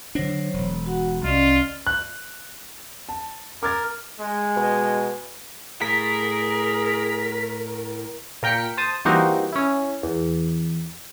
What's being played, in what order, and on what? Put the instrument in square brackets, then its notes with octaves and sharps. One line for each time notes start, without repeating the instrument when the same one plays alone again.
[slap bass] D3 D4 [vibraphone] F#3 C5 C#5
[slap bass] E1
[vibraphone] F#4 F#5
[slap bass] C2 [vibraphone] C#4 D5 D#5 [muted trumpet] F4
[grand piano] F#6
[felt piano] A5
[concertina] A#4 [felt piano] D6 G#6 A6
[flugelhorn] G#3
[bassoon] B2
[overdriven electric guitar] A2 [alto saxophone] G#4 [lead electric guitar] A#4 [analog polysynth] B6
[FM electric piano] A#2 A#4 G5 B6 C#7
C5 A5 D#6
E3 G3 A#3 C4 D#4 F#4
C#4 E4
E2